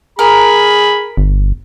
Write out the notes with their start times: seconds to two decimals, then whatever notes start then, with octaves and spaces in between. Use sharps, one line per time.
0.19 G#4 A#4 B5
1.17 G1